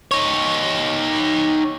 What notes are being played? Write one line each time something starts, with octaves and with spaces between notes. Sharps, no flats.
D#4 C#5